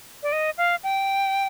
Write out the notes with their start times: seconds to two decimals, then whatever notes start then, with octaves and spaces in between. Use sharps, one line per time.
0.23 D5
0.32 D#5
0.58 F5
0.83 G5